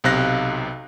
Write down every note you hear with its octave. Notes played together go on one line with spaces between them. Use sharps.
B1 C3 F5 F#6 A#6